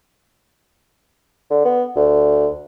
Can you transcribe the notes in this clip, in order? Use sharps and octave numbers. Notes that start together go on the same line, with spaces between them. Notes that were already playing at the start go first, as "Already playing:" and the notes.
D3
B3
D2